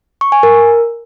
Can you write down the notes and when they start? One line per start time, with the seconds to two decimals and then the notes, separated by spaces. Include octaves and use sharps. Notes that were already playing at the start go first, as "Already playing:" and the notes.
0.21 C#6
0.32 G#5
0.43 A#4